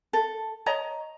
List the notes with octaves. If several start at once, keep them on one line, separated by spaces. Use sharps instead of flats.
A4
C#5 D#5 A#5